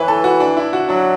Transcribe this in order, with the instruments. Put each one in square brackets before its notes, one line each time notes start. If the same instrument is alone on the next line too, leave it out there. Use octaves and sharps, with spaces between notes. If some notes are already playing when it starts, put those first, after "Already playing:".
Already playing: [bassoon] E3 [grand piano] B4 C#5
[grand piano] A4
F#4
D4
E4
F#4
[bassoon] F#3 [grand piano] D4